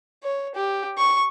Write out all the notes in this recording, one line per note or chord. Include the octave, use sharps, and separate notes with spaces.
C#5
G4
C#6